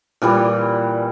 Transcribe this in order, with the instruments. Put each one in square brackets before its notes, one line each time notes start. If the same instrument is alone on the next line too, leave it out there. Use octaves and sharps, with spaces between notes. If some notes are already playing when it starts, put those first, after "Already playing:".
[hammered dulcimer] A#2 E3 G3